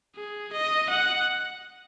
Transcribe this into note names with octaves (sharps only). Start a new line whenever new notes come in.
G#4
D#5
F#5